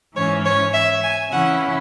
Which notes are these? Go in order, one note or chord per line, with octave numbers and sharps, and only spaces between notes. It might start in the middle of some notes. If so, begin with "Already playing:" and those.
G#2 E3 C#4 C#5
C#5
E5
G#5
C#3 E3 C#4 E4 F#5